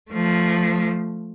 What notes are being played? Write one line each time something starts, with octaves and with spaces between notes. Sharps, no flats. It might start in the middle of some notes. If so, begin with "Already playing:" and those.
F3 A3